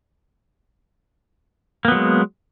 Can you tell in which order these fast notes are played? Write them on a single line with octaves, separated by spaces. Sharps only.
A#3 B3 F#3 G#3